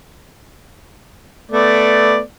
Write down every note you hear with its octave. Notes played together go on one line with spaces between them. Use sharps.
A3 B3 D5